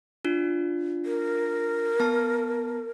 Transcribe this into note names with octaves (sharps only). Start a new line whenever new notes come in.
D4 F4
A#4
B3 A5